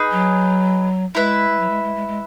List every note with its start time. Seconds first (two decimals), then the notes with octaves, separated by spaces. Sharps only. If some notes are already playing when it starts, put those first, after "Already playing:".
Already playing: D#4 G#4 B4
0.12 F#3
1.15 G#3 E4 B4 E5
1.50 G#3
1.59 F#3
1.70 G#3
1.84 G#3
1.96 G#3
2.08 G#3